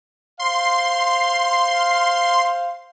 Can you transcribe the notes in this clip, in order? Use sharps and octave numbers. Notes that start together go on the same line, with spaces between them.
C5 F5 C6